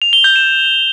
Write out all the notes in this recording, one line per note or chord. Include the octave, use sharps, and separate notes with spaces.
F7
G7
G6
E7